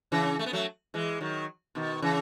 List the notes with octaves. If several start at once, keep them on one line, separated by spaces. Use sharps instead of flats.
C#3 E3
A3
B3
F#3 A3
E3 G#3
D#3 F#3
B2 D#3
C#3 E3